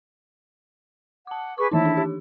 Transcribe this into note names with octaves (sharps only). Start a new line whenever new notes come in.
F#5 A5 D6
G#4 B4 C#6 D6
D#3 E3 D#4 E4 A5
D4
G4